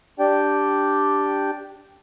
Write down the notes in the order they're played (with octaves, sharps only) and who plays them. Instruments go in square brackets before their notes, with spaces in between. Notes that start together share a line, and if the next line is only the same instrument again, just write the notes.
[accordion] D4 G4 D5 G5